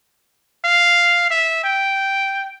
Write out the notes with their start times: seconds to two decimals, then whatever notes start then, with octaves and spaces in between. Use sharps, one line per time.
0.64 F5
1.30 E5
1.64 G5